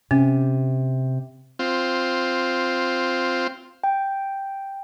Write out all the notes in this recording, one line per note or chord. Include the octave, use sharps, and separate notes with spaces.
C3 C#4
C4 F4
G5